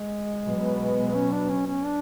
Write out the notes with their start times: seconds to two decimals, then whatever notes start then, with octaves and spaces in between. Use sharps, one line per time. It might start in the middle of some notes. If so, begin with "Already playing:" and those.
Already playing: G#3
0.45 B2 F#3 B3
1.14 C#4
1.32 D4
1.49 C#4
1.66 C#4
1.84 D4